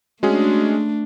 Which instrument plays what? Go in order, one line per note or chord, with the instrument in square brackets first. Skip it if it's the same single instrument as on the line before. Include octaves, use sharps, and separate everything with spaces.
[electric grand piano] G#3 C#4 G#4 [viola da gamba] A3 D4 [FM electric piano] F#4